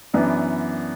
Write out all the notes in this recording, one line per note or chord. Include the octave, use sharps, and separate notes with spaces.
F#2 E3 B3 D4